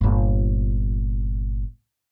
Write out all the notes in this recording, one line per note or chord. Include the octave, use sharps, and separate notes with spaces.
G1 A#2